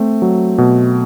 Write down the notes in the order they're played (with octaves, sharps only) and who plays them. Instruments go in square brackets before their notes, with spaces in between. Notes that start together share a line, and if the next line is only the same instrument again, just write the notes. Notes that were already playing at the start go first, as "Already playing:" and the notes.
Already playing: [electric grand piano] A3 C4
F#3
B2